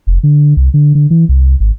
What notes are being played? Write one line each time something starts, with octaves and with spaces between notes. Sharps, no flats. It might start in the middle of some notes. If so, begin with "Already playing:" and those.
F1
D3
C2
D3
D3
E3
C2
G#1